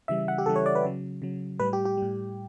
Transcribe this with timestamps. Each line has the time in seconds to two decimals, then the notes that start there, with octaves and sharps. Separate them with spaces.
0.08 C#3 E3 G3 E5
0.28 F#5
0.38 G4
0.46 C#3 E3 G3 A4
0.56 C#5
0.66 D5
0.75 B4
0.84 C#3 F#3
1.22 C#3 F#3
1.59 A2 G3 B4
1.73 G4
1.85 G4
1.97 A2 G3